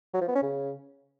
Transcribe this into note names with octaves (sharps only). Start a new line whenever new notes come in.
F#3
F3
B3
C#4
C#3